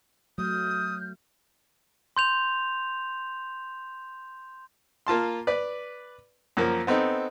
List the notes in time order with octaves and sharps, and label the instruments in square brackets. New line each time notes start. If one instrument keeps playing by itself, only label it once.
[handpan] F#3 A3 [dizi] D#6 [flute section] F6 G6
[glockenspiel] C6 G6 F7
[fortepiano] A#3 F4 A5 C6
B4 D5
F#2 F3 A#3
B3 C4 D#4 A4